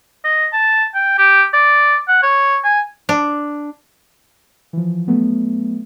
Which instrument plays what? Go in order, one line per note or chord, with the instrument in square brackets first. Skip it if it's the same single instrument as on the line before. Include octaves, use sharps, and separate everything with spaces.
[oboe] D#5
A5
G5
G4
D5
F#5
C#5
G#5
[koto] D4
[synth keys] E3 F3
F#3 A3 B3